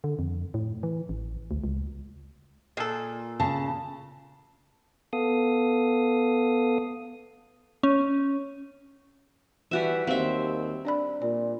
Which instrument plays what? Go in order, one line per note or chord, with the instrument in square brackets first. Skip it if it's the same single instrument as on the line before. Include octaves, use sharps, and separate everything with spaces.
[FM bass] D3
F2
A2
E3
A1
D2
C#2
[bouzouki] A#2 [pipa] G#4 A4
[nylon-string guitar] C#3 [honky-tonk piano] A5
[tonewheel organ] B3 A4 F5 D#6
[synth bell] C#4
[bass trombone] E3 [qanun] G3 F#4 E5
[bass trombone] D#2 [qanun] C4 E5 [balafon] F5
[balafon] D4 D5 B5
[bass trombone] A#2 [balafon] D5